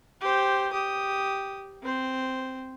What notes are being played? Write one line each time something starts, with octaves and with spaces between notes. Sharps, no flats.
G4 C5
G4 D#6
C4 C5